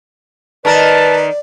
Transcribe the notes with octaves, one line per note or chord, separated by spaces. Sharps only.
D#3 A#4 B4 D5 A5